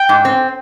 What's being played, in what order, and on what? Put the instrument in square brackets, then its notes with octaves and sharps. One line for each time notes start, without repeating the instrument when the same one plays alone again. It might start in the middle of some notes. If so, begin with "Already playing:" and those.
Already playing: [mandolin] G5
[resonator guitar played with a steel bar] G#2
C4